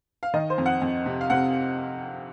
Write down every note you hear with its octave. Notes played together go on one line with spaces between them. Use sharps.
F5
D#3 D#5
C5
F2
F#5
F2
C3
F5
C3 F#5